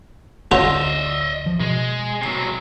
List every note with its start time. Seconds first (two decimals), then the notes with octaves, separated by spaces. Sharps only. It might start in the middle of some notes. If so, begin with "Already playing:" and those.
0.51 D2 C#4 F4 F#4 D#5 E5
1.46 F3
1.60 B2 G#3
2.21 C3 F#3